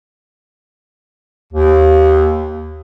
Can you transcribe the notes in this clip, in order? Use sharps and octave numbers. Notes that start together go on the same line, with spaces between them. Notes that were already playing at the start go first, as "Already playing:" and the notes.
D#2